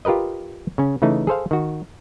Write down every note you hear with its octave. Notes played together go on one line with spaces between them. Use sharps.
F4 G4 A#4 B4 D#5
C#3 C#4
C#3 E3 A3 D#4
G#4 A4 C5 F5
D#3 F#4